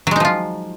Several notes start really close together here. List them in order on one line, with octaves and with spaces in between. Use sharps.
F#3 G#3 D#4 F3 F4